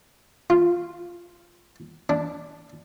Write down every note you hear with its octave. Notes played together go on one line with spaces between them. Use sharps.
F4
D4